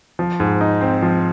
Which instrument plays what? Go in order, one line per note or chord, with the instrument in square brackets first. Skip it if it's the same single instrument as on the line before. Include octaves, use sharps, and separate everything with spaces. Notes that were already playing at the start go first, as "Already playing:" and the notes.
[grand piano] F3
G#2
D#4
C4
F3